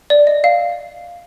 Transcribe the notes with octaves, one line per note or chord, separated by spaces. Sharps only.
D5
D#5
F5